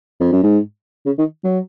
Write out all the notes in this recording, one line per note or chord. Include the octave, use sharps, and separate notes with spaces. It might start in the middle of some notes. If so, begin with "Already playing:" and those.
F2
F#2
G#2
C#3
D#3
F#3